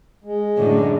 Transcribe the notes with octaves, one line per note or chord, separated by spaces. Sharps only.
G#3
F#2 A2 D3